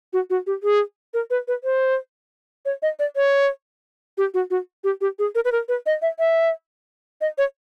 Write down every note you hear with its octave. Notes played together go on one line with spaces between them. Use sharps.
F#4
F#4
G4
G#4
A#4
B4
B4
C5
C#5
D#5
D5
C#5
G4
F#4
F#4
G4
G4
G#4
A#4
B4
A#4
B4
D#5
E5
E5
D#5
C#5